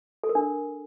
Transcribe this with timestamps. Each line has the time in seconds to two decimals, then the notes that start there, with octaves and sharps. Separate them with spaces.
0.24 A4
0.29 A#4
0.35 D4